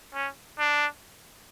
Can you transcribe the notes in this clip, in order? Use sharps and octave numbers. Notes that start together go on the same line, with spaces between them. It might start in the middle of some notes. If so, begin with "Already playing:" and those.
C#4
D4